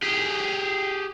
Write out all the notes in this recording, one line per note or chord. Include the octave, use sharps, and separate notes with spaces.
G4 G#4